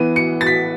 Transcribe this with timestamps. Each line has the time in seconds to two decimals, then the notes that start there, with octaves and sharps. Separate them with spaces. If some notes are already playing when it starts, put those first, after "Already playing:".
Already playing: E3 B3 D#7
0.16 C#7
0.41 A6
0.46 B6